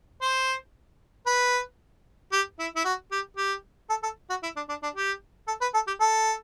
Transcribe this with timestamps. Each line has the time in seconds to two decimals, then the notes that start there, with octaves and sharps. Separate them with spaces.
0.22 C5
1.27 B4
2.32 G4
2.59 E4
2.76 E4
2.85 F#4
3.12 G4
3.37 G4
3.90 A4
4.03 A4
4.30 F#4
4.43 E4
4.56 D4
4.69 D4
4.83 D4
4.96 G4
5.48 A4
5.61 B4
5.74 A4
5.87 G4
6.00 A4